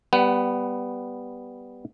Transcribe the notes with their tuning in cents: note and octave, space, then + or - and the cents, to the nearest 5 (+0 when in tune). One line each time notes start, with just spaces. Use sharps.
G3 +0 B3 +0 F#5 +30